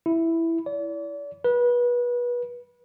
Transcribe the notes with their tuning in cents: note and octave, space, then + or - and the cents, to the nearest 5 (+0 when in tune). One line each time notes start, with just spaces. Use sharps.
E4 +0
D5 -40
B4 -30